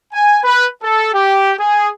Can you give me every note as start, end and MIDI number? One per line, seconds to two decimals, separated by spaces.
0.12 0.38 80
0.44 0.67 71
0.82 1.12 69
1.13 1.52 67
1.58 1.88 68